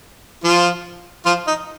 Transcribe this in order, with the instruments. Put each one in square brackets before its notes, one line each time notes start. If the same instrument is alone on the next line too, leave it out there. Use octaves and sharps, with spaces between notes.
[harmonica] F3 F4
F3 F4
D#4